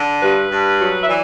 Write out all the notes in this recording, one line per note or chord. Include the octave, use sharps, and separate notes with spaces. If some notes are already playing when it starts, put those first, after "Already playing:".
Already playing: D3
G2 B4
G2
F#3
E5
E3 D5